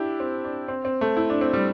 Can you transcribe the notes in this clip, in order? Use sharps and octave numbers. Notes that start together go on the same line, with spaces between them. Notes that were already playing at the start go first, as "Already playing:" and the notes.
Already playing: D4 E4 G4
C4
D4
C4
C4
A3
E4
D4
C4
G3